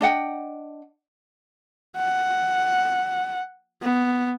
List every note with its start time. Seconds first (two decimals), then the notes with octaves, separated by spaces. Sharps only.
0.01 D4 D#5 F#5 G5
1.97 F#5
3.82 B3